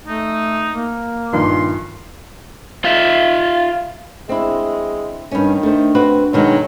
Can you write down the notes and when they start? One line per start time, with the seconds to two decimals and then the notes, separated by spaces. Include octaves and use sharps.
0.07 A3 D#4
0.72 A#3
1.33 A#1 G2 D#3 C6
2.85 F4 E5
4.29 G#3 C4 D4 E4
5.31 G2 D#3 C#4
5.63 A3 D4 C5
5.95 C4 F#4 B4
6.33 B2 D#3 F#3 G#3